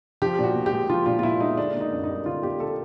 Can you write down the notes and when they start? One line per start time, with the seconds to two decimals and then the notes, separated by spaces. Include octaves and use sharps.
0.22 F3 G4
0.39 A#2 F#4
0.55 A#2
0.66 G4
0.73 G#3
0.90 F3 F4
1.06 A#2 F4
1.19 F4
1.23 A#2 E4
1.40 G#3 D#4
1.57 D3 D4
1.75 A#3
1.81 D#4
1.92 F#2
2.04 D#4
2.09 G3
2.26 D3 F4
2.43 A#3 G4
2.60 A4